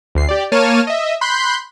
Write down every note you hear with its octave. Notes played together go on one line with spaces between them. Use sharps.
D2 C7
G4 D5
A#3 C#5 A5 F6 D#7
D#5 E5
B5 C6 F#6 G6